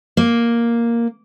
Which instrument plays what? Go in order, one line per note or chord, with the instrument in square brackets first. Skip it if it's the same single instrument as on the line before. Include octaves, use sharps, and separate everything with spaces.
[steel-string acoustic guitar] A#3